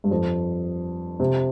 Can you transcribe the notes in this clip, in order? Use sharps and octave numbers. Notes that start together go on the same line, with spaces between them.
G2
F2
C3